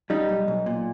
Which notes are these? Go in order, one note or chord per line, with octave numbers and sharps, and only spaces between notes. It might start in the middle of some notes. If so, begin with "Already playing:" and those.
G3 D#4
B1
B1
A#2